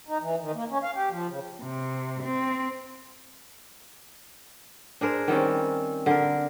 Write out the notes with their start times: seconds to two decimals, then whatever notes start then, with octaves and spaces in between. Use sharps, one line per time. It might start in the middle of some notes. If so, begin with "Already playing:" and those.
0.08 D#4
0.21 E3
0.41 D#3
0.54 A#3
0.70 C#4
0.83 F5
0.95 G4
1.10 F3
1.28 C#3
1.62 C3
2.23 C4
5.01 D4 G#4 A#4 C5
5.28 D#3 G3 C4 C#4
6.06 D3 A#4